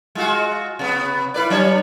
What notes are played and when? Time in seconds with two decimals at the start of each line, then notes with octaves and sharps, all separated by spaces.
0.15 G#3 F4 F#4
0.79 C3 B3
1.34 E4 B4 D5
1.50 F#3 D4 C#5